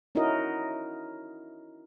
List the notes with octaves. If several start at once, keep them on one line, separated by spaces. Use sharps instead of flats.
C#4 D#4 E4 F#4 A#4 D#5